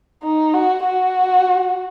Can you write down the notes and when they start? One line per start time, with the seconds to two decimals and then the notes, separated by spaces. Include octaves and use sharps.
0.23 D#4
0.54 F#4
0.83 F#4